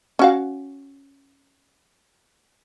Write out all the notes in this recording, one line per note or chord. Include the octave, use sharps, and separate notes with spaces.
C#4 F#4 F5